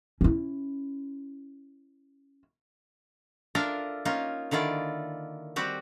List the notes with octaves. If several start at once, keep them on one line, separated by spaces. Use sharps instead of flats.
C#4 E4
D4 F4 A4 A#4 E5
A#3 C#4 D#4 F4
D3 D#3 E4 F4 D5
G3 C4 F#4 G4